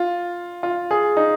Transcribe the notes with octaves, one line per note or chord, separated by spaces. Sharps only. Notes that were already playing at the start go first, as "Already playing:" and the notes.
Already playing: F4
F4
G#4
D#4